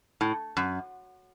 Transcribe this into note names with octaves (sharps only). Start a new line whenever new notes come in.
A2
F#2